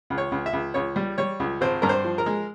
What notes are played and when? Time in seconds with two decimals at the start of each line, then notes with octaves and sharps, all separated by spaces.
0.10 C#2
0.18 C#5
0.32 C#2
0.46 E5
0.53 C#2
0.74 C#2 C#5
0.96 G3
1.18 G3 C#5
1.40 C#2
1.61 G#1 C5
1.82 G2 A#4
1.89 C5
2.04 F3
2.18 A#4
2.26 G#3